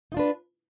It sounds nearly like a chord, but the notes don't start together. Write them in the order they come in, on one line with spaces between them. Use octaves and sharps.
D#4 F4 D4 B4